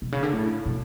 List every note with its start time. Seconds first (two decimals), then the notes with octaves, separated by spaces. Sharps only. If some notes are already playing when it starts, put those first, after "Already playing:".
0.02 B2
0.12 C#3
0.23 D3
0.33 A2
0.66 B2